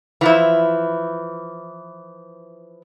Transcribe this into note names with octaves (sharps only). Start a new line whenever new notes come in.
E3 F3 E4